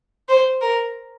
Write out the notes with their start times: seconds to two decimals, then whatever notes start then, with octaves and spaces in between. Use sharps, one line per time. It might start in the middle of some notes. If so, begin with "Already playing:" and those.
0.29 C5
0.61 A#4